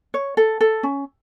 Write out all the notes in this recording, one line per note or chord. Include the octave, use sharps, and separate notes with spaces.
C#5
A4
A4
C#4